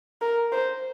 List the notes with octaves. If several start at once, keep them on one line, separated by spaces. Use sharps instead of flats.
A#4
C5